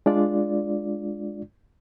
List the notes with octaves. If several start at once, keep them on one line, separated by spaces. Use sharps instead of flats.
G#3 D4 F4 D5